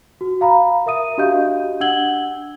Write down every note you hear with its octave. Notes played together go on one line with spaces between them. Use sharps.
F#4
F5 A#5 B5
A#4 E5 D#6 D#7
D4 F#4 G4 D#5 F5 G6
D4 F#5 E6 G#6 F#7 G7